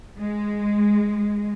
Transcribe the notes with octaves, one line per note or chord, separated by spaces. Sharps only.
G#3